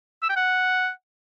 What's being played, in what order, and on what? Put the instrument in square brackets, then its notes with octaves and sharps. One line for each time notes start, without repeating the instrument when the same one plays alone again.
[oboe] E6
G5
F#5